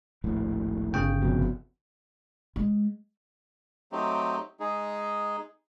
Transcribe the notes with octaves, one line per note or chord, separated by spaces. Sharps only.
D#1 A#1 A2
G1 C#3 G5
F1 F2 B2
G#3
F#3 A3 C4 D#4 G4
G#3 D#4 G#4